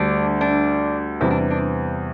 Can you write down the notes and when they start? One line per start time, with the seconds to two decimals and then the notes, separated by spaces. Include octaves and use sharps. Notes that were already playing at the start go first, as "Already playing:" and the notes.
Already playing: D2 D3 G3 D4
0.41 D4
1.21 E2 C3 G3 C4 E4
1.31 D4
1.50 D4